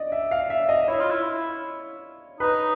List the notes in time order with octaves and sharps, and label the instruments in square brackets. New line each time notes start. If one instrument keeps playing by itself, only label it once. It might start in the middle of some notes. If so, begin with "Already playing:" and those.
Already playing: [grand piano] D5 D#5
E5
F5
E5
D#5
[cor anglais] E4 [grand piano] C#5
[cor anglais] F4
E4
[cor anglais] D#4 [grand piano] B4